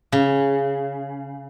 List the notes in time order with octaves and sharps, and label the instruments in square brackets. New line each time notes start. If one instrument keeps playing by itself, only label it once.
[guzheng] C#3